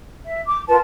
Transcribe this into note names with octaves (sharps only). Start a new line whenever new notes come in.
E5
D6
F4 A#4 B4 A5